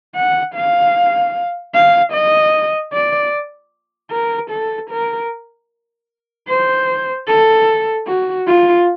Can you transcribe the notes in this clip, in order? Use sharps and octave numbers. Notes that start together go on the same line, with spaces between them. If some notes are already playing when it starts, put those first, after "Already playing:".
F#5
F5
F5
D#5
D5
A#4
A4
A#4
C5
A4
F#4
F4